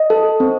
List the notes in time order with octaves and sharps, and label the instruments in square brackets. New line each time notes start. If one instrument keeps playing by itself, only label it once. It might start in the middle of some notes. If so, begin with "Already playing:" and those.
Already playing: [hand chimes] D#5
A4
C4